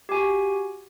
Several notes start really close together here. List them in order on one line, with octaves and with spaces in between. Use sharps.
G4 G#5 F#4